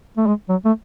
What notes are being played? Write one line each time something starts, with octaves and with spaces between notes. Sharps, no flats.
A3
G#3
F#3
A3